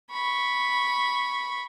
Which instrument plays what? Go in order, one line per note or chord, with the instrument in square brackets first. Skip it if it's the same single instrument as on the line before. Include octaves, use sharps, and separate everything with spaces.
[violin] B5 C#6